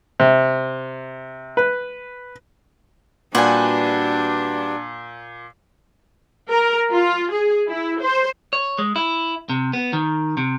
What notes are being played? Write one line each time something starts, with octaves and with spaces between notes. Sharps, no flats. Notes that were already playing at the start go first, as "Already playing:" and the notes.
C3
B4
A#2 G3 D4 F#4 B4 F#5 G#5
A#4
F4
G#4
E4
C5
C#5
G#3
E4
C3
B3
D#3
C3